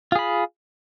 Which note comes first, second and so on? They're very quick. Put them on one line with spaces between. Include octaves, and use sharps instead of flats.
F4 G#4 B5